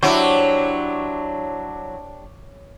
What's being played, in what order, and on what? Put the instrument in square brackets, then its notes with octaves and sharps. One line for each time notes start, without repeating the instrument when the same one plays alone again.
[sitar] F#3 E4 [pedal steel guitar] D4 G4 C5 [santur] C#5 D6